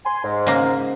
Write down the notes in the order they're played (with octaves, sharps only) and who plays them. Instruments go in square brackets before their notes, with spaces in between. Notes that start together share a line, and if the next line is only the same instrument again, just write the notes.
[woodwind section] G#5 C6
G#2
[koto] C#3 A#3